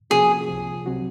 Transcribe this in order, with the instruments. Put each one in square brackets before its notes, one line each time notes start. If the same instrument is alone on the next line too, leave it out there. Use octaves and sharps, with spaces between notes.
[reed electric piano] C3 F3 A#3 C#4 F#4 [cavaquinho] G#4
[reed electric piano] C2 C3 F3
C3 F#3 C4 F#4